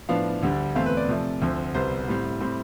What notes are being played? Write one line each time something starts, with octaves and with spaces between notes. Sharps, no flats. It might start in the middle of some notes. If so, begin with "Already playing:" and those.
A2 F3 B3 D4 F5
D2 D3 G3 D4
E2 B2 A3 C4 F5
B4
D5
C3 F3 A3
D2 D3 F3 C4
C2 B2 G3 B3 C5
A2 G3 C4
A2 G3 C4